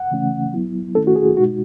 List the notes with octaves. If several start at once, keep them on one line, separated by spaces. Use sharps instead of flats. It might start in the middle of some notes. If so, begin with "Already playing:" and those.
Already playing: F#5
C#3 E3 A3 C#4
F#3 B3 E4
D#3 A3 C#4 E4 A4
F#4
G#4
B2 G#3 D#4 F#4